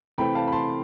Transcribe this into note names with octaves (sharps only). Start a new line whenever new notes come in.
C3 E3 A3 C4 G5 B5
F5 A5
B5
A5 C6